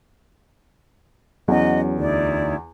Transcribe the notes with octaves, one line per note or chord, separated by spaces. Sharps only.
E2 F#3 C#4 D#5 F#5
D2 D#4 E4 D5